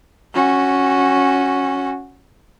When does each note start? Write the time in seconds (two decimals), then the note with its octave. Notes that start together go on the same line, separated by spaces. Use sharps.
0.34 C#4 F#4